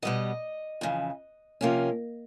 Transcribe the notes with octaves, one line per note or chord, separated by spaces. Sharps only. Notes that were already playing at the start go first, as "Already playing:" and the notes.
B2 G3 B3 D#5
F2 C#3 E3
C3 F3 A#3 C#4